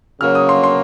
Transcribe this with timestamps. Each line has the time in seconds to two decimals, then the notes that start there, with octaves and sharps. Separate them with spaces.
0.20 C#3 F#3 A#3 F6
0.35 D#6
0.49 C6
0.64 C6